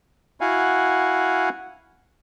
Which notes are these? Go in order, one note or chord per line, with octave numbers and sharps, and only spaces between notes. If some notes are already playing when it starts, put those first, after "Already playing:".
E4 F#4 F5 F#5 G#5